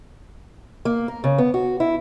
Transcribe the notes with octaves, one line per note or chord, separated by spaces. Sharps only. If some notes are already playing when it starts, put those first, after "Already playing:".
A#3
A#4
C#3
B3
F#4
E4